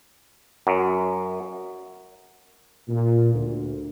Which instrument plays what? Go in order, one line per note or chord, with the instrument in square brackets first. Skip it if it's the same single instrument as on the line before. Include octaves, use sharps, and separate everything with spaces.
[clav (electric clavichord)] F#2
[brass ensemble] A#2
D2